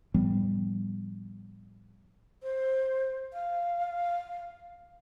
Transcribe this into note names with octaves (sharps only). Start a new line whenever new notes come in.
A2 F3 G3 B3
C5
F5